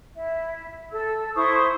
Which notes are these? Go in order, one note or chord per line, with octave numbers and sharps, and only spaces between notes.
E4 E5
A4 E6
E4 C5 C#6 D#6